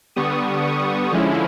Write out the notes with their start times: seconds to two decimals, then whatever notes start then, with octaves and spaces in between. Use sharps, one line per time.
0.16 D3 G3 B3 C#6 D#6
0.64 C#6 D#6
1.11 D3 F3 G#3 C#4 E4